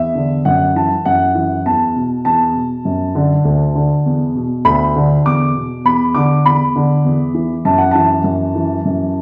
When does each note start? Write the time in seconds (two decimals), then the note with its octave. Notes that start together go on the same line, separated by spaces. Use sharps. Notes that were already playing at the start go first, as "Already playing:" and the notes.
Already playing: E2 E5
0.15 D3
0.45 F#2 F#5
0.76 E3 A5
1.06 F#2 F#5
1.35 E3
1.65 E2 A5
1.96 B2
2.25 E2 A5
2.55 B2
2.85 F#2
3.15 D3
3.45 D2
3.75 D3
4.06 E2
4.35 B2
4.65 D2 B5
4.96 D3
5.26 E2 D6
5.55 B2
5.85 E2 B5
6.15 D3 D6
6.45 E2 B5
6.76 D3
7.05 E2
7.34 E3
7.65 F#2 A5
7.78 F#5
7.91 E3 A5
8.24 F#2
8.55 E3
8.85 F#2